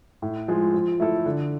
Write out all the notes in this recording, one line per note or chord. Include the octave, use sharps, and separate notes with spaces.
A2
F3 G#3
F3
A3 E4 A4
D3